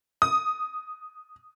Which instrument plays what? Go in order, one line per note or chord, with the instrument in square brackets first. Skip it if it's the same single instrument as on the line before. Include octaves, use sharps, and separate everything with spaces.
[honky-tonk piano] D#6